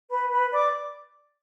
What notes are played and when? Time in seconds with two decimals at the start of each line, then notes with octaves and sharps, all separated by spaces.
0.10 B4 B5
0.31 B4 B5
0.52 D5 D6